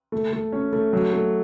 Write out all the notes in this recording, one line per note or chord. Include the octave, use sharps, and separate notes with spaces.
A3
A3
C#4
A3
F#3
A3